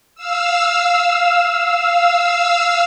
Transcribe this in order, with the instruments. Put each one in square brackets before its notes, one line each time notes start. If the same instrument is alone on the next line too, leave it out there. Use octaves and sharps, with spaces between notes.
[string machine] F5 E6